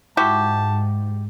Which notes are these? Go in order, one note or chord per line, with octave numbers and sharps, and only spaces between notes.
G#2 E4 F#4 G4 A5